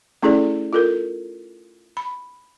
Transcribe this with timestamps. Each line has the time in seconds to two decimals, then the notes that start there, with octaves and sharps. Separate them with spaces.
0.23 A3 C#4 E4 G#4 A4 D5
0.73 F4 A4 A#4
1.97 B5